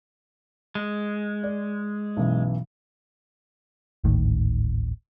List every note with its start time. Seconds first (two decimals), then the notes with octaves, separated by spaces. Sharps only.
0.75 G#3
1.43 D5
2.17 B1 F#2 E3
4.04 D1 G#1 A2 D#3